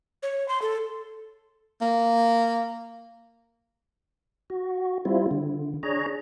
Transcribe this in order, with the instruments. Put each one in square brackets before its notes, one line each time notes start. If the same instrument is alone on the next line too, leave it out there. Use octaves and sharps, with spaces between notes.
[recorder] C#5
C6
A4
[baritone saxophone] A#3
[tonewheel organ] F#4
G3 C4 E4 F4
D3
D4 G#4 C#5 A#5